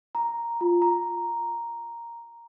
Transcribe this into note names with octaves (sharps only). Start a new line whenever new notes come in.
A#5
F4
A#5